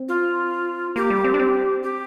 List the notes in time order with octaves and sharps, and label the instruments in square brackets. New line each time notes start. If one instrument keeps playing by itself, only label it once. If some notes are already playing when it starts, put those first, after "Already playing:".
Already playing: [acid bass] C4
[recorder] F4
[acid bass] A#3 [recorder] G4
[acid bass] G3
C4
D4
C4
[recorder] G4